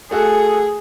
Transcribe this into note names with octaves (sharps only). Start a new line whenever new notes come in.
A3 F#4 G#4 A4